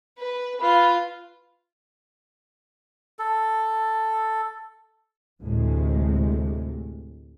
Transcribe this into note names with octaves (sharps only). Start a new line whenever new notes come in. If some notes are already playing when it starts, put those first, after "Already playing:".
B4
F4 B4
A4
D2 A2 C3 G#3